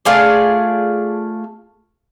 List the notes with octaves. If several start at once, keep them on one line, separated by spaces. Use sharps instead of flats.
A3 F4 G#4 D5